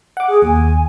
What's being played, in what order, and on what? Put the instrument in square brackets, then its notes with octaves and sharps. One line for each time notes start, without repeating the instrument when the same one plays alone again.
[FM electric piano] F#5 D6
[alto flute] G#4
[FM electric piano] D#2 [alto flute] G#5